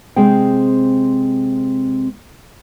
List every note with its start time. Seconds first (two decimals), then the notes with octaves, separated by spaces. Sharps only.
0.16 C3 G#3 C4 G#4 G5